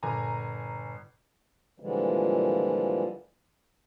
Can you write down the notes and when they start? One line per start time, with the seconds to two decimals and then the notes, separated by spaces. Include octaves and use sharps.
0.03 G1 A#2 G#5 A#5
1.80 A#2 D3 E3 F3 G3 G#3